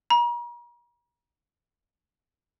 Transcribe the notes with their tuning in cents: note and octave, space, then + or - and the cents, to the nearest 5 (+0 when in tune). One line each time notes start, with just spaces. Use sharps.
A#5 +40